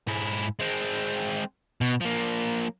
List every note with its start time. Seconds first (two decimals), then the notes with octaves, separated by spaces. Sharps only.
0.08 G#2 E4
0.59 G#3 C4
1.81 B2
2.01 F3 A#3